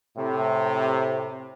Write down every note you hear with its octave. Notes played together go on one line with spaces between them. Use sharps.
A2 C3